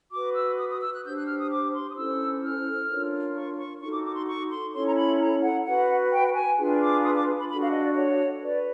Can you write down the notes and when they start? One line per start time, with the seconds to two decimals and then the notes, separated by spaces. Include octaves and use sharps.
0.12 F#4 B4 D6
0.35 E6
0.59 D#6
0.69 D#6
0.81 E6
0.93 F#6
1.04 D4 G4 C5 G6
1.16 F#6
1.27 F6
1.39 D#6
1.50 D6
1.73 C6
1.90 D#6
1.96 C#4 E4 A4 C5 E6
2.42 F6
2.88 D4 F4 A#4 C#5
3.35 C#6
3.57 C#6
3.80 D#4 F#4 A4 C#6
3.92 D6
4.04 D6
4.15 C6
4.27 C#6
4.49 C6
4.73 C#4 E4 A4 C#5 C6
4.88 A#5
4.95 B5
5.19 A#5
5.42 F#5
5.65 F#4 B4 F#5
6.11 G5
6.27 G5
6.34 G#5
6.58 D4 F4 G#4 B4
6.81 D6
7.04 D#6
7.15 D6
7.38 B5
7.49 D4 F#4 A4 B5
7.61 F5
7.72 D#5
7.84 D5
7.95 C#5
8.42 F#4 B4 D5